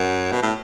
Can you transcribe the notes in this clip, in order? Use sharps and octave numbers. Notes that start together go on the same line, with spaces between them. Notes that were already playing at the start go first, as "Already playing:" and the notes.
Already playing: F#2
B2
A2